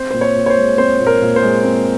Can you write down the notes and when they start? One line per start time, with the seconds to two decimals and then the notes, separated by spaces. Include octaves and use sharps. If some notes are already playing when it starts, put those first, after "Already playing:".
Already playing: C4 C5
0.11 A#2 C5
0.21 C#5
0.36 A#2
0.46 C#5
0.50 C5
0.57 G#3
0.78 C4 C5
0.99 A#2
1.07 A#4
1.22 A#2
1.36 C5
1.42 G#3
1.64 C4